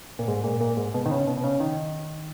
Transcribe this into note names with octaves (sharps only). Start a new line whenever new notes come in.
A#2
G#2
A#2
A#2
G#2
B2
D#3
C#3
B2
B2
C#3
D#3